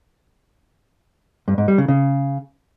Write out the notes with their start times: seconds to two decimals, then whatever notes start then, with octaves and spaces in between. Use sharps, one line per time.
1.48 G2
1.58 G#2
1.68 G3
1.78 C#3
1.88 C#3